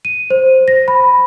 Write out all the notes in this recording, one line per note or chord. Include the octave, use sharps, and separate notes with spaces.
D#7
C5
A#6
B5